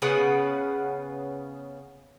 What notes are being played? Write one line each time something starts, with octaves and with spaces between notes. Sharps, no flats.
C#3 B3 B4 F#5